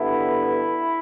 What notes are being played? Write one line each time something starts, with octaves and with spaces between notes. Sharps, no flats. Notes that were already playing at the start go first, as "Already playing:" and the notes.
Already playing: G2 D3 B3 E4